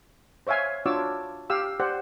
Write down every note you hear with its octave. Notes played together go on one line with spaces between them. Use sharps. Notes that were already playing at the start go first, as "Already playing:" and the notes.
C5 C#5 E5 F5 G#5
D4 F4 F#4 C#5 D6 E6
G4 F5 E6
G4 C5 D5 F#5